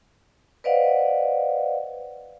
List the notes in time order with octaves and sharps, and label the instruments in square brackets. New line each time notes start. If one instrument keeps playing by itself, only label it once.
[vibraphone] B4 C5 D5 D#5 F5 F#5